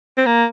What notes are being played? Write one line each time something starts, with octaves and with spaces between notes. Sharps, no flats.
C4
A#3